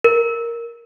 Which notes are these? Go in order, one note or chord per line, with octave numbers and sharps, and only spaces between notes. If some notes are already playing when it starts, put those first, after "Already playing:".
A#4